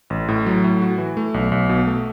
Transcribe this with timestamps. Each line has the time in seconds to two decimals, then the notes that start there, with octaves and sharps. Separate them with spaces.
0.10 A1
0.29 A2
0.46 F#3
0.64 A2
0.82 F#4
0.98 E3
1.17 A3
1.34 B1
1.52 B1
1.69 B2
1.87 A3